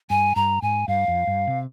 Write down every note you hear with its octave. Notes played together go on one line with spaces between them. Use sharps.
G2 G#5
G2 A#5
G#2 G#5
G2 F5
F2
G2
C3